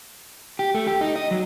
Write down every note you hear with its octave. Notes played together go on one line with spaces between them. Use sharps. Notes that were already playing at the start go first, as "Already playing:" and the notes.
G4
A3
G4
D#4
D#5
F#3